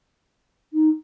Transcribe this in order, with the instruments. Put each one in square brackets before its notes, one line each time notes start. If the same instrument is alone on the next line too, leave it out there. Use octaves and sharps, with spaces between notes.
[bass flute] D#4